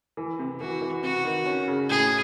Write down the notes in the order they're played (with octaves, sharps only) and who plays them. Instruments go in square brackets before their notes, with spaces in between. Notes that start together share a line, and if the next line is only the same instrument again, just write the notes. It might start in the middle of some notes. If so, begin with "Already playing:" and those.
[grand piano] E3
C3
[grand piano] E3 [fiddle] F#4
[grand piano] E3
[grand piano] C3 [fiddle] F#4
[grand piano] D#3
C#4
C#3
[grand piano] A2 [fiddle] G#4